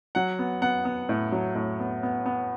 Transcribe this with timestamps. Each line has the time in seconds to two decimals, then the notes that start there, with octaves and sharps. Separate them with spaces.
0.15 F#3 F#5
0.39 B3
0.62 B3 F#5
0.85 B3
1.09 A2
1.32 F#3
1.55 A2
1.80 B3
2.03 B3
2.26 B3